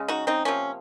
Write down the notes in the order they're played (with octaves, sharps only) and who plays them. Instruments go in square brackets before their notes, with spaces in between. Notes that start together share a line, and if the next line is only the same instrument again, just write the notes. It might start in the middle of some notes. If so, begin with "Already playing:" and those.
Already playing: [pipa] C#3 G#3
D#4 F#4
C4 D#4
C3 F3 A#3 C#4